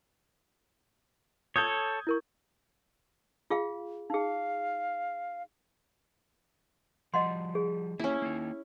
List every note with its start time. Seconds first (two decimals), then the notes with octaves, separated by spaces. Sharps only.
1.56 A4 C#5 D#6 G6 G#6
2.07 E4 A#4 C#6
3.50 F4 G#4 F5
4.10 D#4 G#4 F5
7.14 F3 G3 D#5 F#5 C6
7.55 G#4
8.00 A#3 C#4 E4 G4
8.22 A#3 D#4